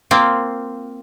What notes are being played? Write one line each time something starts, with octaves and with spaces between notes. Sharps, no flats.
A#3 C4 F4